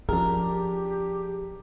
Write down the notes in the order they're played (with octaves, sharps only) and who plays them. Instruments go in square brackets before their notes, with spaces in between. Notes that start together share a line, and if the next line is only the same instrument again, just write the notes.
[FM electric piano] F3 G#4 [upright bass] C#4 [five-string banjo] D4 A#4 [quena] G4